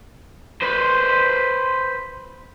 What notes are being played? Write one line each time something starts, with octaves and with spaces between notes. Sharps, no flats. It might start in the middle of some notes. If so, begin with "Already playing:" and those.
B4 C5